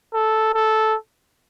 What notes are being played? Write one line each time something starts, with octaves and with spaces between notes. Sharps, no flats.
A4
A4